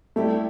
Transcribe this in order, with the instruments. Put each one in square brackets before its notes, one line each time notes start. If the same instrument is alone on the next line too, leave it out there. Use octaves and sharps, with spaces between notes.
[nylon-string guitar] A2 G3 E4 G4 [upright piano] A3